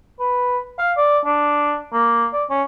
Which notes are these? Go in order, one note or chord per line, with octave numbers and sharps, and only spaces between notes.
B4
F5
D5
D4
A#3
D5
C#4